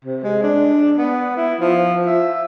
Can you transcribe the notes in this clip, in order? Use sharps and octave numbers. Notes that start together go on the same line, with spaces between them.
C3
G#3
D4
B3
E4
F3
E5